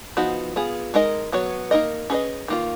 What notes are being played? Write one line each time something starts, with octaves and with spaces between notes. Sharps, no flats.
F3 B3 D#4 F#4
B3 F4 G#4
G#3 D#4 A#4 D#5
F#3 B3 F#4 C#5
A#3 D#4 A#4 D#5
C#4 G#4 B4 D#5
D#3 A#3 F4